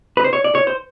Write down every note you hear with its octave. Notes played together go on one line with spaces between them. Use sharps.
B4
C5
C#5
D5
C#5
C5